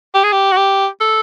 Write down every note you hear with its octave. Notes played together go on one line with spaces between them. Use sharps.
G4
G#4
G4
F#4
G4
A4